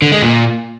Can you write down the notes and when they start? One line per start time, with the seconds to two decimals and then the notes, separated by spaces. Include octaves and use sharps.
0.02 D3
0.12 G#3
0.22 A#2